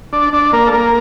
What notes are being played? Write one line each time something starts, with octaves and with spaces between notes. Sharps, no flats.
D4 D5
D4 D5
A#3 A#4
A4
A#3 A#4